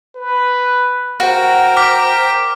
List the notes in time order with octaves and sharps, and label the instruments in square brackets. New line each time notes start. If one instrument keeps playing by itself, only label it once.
[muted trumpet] B4
[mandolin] F#4 [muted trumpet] A#4 [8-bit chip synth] C5 G5
[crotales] D6 F6 B6